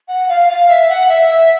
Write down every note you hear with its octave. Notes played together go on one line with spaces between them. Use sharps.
F#5
F5
F5
E5
F#5
E5
E5